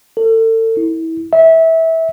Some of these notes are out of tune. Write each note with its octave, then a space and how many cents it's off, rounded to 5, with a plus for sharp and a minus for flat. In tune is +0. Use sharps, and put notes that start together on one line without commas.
A4 +35
E4 -25
E5 -20